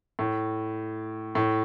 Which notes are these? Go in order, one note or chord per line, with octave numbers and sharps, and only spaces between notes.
A2
A2